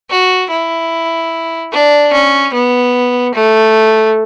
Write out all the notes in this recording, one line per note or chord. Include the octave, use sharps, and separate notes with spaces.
F#4
E4
D4
C#4
B3
A3